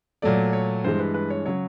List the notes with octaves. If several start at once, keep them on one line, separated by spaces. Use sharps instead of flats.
A#2 F#3 A3 D5
C#5
G2 E3 G#3 C5
B4
B4
C#5
C#3 F#3 C#5